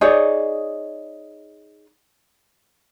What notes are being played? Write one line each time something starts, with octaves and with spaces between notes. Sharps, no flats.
D#4 G#4 C#5 D5